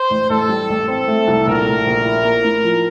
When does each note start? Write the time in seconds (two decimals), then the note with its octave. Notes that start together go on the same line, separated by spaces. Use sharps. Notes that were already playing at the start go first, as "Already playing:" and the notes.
Already playing: C5
0.10 A1
0.29 A1 A4
0.49 G3
0.69 A1
0.88 C4 A4
1.08 A3
1.27 C2
1.47 A#1 A#4
1.66 A3
1.86 A#1
2.05 E4
2.25 A#3
2.44 A2
2.64 F3